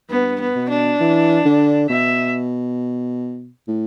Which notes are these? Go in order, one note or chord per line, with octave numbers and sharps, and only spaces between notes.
G2 B3
B3
B2
D4
E3
D3
B2 E5
A2